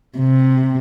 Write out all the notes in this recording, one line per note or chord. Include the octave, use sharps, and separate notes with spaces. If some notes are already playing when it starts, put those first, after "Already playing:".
C3